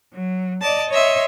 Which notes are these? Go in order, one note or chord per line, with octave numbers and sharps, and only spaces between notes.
F#3
D5 D#5 A5
C#5 D#5 E5 C6